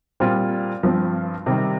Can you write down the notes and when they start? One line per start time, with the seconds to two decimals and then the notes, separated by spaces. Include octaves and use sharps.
0.20 A#2 G3 C4 F4
0.83 G2 F3 C4
1.46 C3 D#3 G3